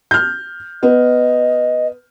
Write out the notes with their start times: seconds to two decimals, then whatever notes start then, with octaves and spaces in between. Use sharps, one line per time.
0.11 F6 G6
0.83 B3 D#5